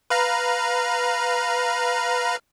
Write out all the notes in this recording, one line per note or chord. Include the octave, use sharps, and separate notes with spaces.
B4 F5 A#5